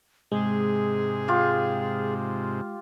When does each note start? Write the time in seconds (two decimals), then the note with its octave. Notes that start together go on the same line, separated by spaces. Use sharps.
0.32 G#2 C3 G#3 G#4
1.28 F4 G4